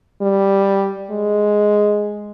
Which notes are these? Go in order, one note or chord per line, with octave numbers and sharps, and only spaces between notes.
G3
G#3